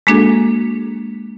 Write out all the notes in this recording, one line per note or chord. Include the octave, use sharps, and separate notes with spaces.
G#3 A#3 D4 F#4 G#4 A4